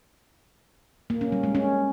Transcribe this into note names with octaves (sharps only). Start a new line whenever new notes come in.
A#3
C#4
G3
G#3
C#4